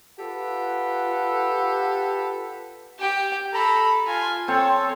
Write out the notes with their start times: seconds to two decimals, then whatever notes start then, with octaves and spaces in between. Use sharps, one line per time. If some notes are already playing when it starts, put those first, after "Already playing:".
0.19 F4 G4 A4 B4 F#5
2.99 G4 G5
3.53 A4 A#5 B5
4.07 F4 G#5
4.48 C4 A4 C#5